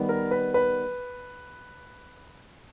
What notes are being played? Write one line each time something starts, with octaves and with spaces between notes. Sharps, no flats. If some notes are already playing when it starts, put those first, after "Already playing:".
Already playing: D#3 G3 B3
A#4
B4
B4